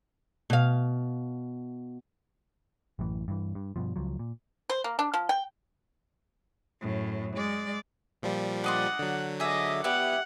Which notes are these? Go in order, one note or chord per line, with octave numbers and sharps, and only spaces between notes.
B2 F5
A1 F#2 A2 E3
G2 E3
G2
G2 B2 F3
C#2 F3 F#3
A#2
C5
A#3
D4
F3
G5
F#2 A2
G#3 D5
A#2 F3 G3
D4 D#5 F#5 C6
D3 F#3
G#4 D#5 E5 D6
B3 E4 G4 D5 F#5